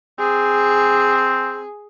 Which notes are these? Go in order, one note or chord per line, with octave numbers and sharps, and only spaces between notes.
C4 G#4